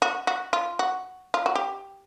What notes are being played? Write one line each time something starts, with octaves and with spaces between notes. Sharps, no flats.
F#4
F#4
F4
F#4
F4
F#4
G4